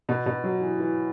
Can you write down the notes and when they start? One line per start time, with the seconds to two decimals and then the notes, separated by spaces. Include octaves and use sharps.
0.09 B2
0.26 B2
0.44 F#3
0.61 E3
0.80 E3